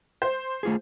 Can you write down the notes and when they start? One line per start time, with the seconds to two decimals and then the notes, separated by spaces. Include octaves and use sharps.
0.22 C5
0.63 A3 F4 G#4